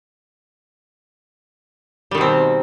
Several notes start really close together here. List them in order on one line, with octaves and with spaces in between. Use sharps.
G3 D#3 B2 C4